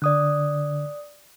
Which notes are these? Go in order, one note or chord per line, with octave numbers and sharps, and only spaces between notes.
D3 D5 D#6 F#6